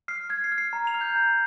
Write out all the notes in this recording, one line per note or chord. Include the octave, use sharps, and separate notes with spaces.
F6 C7
F6 G#6
C7
F6
C7
A#5
F7
F6
G6
A#5